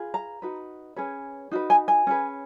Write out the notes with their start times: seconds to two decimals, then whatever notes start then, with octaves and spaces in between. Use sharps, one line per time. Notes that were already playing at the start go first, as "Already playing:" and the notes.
Already playing: F4 G#4 B4
0.14 A#5
0.42 D#4 F#4 B4
0.96 C#4 G#4 B4
1.51 D#4 F#4 B4
1.70 G#5
1.88 G#5
2.07 C#4 G#4 B4